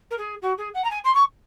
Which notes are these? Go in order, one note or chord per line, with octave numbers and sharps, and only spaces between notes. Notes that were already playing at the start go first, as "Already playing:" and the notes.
A#4
G#4
F#4
G#4
F#5
A#5
G#5
C6
C#6